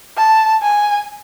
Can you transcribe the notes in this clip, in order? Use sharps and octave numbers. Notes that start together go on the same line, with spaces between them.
A5
G#5